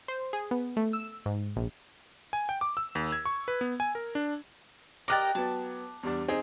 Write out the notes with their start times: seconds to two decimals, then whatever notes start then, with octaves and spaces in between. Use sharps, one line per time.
0.08 C5
0.33 G#4
0.51 B3
0.77 A3
0.93 E6
1.26 G#2
1.56 A#1
2.33 G#5
2.49 G5
2.61 D6
2.77 E6
2.95 D#2
3.12 G#6
3.26 C#6
3.48 B4
3.61 B3
3.80 G#5
3.95 A#4
4.15 D4
5.08 G4 A#4 D#5 D6 F#6 A6
5.35 F#3 B3 A5
6.03 E2 G3 D4
6.28 C4 D#4 G#4